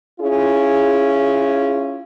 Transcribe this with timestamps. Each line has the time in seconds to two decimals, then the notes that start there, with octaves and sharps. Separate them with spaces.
0.20 C#4 E4 F4 G#4